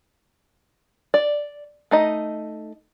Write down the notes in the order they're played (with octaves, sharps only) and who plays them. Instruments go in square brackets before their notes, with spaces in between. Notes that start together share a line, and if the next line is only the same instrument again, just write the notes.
[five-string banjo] D5
A3 D#4 D#5